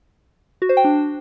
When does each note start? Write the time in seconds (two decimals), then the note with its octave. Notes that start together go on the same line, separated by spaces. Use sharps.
0.62 F#4
0.69 C5
0.77 G5
0.84 D4